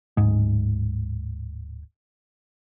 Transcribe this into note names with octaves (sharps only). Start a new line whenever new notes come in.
D1 G#2 G#3